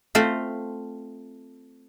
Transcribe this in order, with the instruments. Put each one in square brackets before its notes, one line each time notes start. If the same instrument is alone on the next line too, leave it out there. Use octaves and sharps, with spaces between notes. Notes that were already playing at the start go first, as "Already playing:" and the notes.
[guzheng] A3 C4 F4 C5